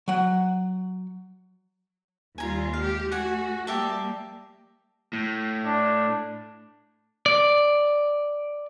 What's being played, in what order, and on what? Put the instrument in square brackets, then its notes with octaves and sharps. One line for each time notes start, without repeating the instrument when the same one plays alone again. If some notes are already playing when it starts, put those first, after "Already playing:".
[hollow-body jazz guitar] F#3 F#5
[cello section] D#2 G3 F4 [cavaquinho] G#5 A#5
[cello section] G#3 G4 [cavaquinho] F5
[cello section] A3 F#4 [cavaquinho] F#5 G#5
[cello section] G3 A#3 [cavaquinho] G4 E5 A5
[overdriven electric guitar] A2
[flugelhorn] D4
[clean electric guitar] D5